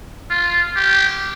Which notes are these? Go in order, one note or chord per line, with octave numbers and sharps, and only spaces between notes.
F4
G4